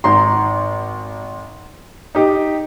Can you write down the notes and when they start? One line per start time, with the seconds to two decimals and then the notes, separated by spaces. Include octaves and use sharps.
0.04 G#1 A#5 C6
2.15 D#4 G4